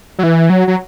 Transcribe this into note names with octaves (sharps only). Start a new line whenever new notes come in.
F#3
E3
F#3
F#3